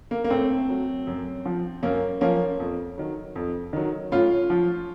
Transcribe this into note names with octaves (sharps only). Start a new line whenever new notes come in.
A#3
A#3
A2 A3 C4
F#3
F#2
F3
F#2 A#3 C#4
F3 A#3 C#4
F2
D#3 F#3
F2
D#3 F#3
A2 C#4 F4
F3